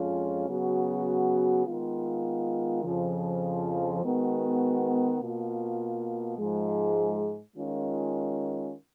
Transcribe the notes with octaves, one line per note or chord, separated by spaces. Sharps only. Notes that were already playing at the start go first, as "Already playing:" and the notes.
Already playing: F2 F3 G#3 C#4 F4
C#3 F#3 B3 F#4
D#3 G#3 B3 F4
F2 C#3 F3
D#3 G#3 B3 F#4
B2 A#3 F4
G#2 F3 G#3
D#3 G#3 C#4 F4